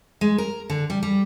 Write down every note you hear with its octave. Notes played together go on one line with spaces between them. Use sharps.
G#3
A#4
D3
G3
G3